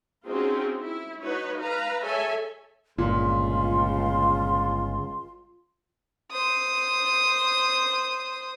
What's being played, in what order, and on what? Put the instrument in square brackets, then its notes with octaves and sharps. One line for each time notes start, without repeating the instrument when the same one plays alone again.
[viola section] C4 C#4 D#4 F4 F#4 G#4
E4
D#4 F#4 B4 C#5
B4 F5 A#5
G#4 A4 C#5 E5 G#5
[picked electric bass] G1 [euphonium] C#2 [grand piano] A#2 [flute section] F4 C6
[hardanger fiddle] C5 D#6